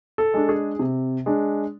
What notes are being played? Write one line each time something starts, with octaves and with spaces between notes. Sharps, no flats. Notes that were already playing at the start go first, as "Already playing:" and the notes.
A4
G#3 D4
G#4
C3
G#3 D4